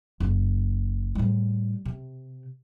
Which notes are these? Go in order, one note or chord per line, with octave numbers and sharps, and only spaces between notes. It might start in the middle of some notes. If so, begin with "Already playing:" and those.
F#1
A2 G3
C3